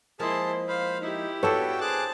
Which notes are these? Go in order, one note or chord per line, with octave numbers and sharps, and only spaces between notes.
F3 G#3 A#3 E4 G#4 A5 C6
C5 F5 B5
D#4 E4 G4
B3 D4 F#4 A4 C#5 G5
G#4 C5 A5 D6 F#6